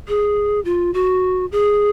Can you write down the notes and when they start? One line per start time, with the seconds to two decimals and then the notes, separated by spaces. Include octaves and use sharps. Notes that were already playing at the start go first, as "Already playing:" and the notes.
0.08 G#4
0.65 F4
0.94 F#4
1.52 G#4